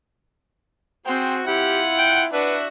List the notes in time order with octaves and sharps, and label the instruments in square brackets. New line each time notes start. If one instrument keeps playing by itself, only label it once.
[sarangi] C4 [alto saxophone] F#4 [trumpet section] G#4 C5 G5
[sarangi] E4 [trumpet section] F4 F#5 [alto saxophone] G4
[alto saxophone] G5
[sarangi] D4 [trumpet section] F#4 E5 F#5 [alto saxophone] B4